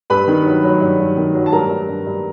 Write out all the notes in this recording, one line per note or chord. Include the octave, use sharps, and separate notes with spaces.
G2 B4 B5
D#3
F#3
F#3
G2
G2
D#3
F#3
A5
G2 A#4 A#5
G2
G2
G2